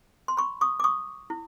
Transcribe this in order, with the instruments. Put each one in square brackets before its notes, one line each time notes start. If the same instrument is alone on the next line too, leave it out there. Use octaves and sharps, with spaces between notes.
[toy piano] C6
B5 C#6
C#6 D#6
D6
C#6 D#6
E4